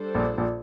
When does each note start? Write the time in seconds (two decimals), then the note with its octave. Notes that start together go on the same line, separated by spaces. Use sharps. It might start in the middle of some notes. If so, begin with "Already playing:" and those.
Already playing: G3 D4 A4 C5
0.15 A#1 A#2
0.38 A#1 A#2